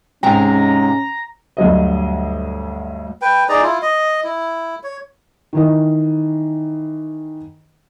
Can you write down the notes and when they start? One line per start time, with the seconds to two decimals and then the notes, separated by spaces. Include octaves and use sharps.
0.23 G#2 C3 G#3 C#4 G5 A#5
1.57 D2 G2 F#3 D#5
3.22 B4 G5
3.49 D#4 G#4 D5 A#5
3.62 E4 F4
3.82 D#5
4.24 E4
4.83 C#5
5.53 D#3 E3 D#5